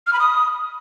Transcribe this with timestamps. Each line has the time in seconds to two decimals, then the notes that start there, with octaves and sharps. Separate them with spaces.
0.07 F6
0.13 B5
0.20 D#6